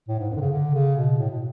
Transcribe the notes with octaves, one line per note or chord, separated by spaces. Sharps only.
A2
G#2
F#2
D3
C#3
D3
C#3
B2
A2
B2